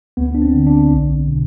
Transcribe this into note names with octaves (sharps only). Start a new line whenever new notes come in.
D2 B3
D4
C4
D3
D4
B1
B2